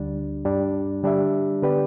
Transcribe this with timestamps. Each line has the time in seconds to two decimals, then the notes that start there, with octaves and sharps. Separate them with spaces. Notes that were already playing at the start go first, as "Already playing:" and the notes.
Already playing: D2 D3 G3 D4
0.45 G2 G3 D4
1.03 D3 G3 D4 G4 E5
1.62 D3 B3 G4 B4 D5